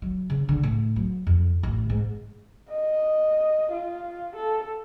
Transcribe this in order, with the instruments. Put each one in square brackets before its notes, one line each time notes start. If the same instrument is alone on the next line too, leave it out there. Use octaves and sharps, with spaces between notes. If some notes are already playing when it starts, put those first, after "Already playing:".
[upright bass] F#3
C#3
D3
A2
F#3
F2
A1
G#2
[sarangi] D#5
F4
A4